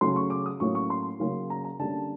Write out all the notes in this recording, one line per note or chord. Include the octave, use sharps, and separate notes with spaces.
C#3 F#3 A3 C#4 C6
C#6
D6
D#6
A2 F#3 A#3 C#4 C#6
C#6
C6
C#3 F#3 A#3 C#4
A#5
A#5
D3 G3 A#3 C#4 A5